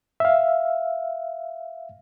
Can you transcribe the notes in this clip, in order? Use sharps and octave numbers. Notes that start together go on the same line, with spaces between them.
E5 F5